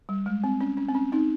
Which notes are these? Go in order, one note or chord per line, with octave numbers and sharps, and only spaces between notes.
G3
G#3
C4
C#4
C#4
C4
C#4
C4 D#4